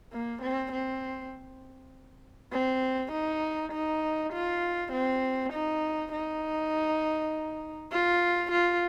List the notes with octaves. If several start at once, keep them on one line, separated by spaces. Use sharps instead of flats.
A#3
C4
C4
C4
D#4
D#4
F4
C4
D#4
D#4
F4
F4